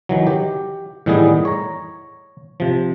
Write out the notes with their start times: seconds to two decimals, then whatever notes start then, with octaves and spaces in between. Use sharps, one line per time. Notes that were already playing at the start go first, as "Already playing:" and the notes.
0.09 D#3 E3 F#3
0.27 G4
1.06 A2 D#3 E3 G3 B3 G#4
1.45 C#5 A#5
2.60 C3 F3